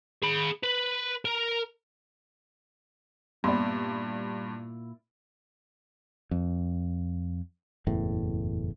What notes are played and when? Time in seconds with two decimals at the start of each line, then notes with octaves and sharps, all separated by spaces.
0.23 G#4 B5
0.64 B4
1.25 A#4
3.44 G2 A#2 A#3 B3 E4 D5 B5 C6
6.31 F2
7.87 F#1 E2 A2